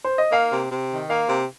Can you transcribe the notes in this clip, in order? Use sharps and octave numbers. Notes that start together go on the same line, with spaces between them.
C5
D#5
A#3 F5
C3
C3
D#3
A#3 F5
C3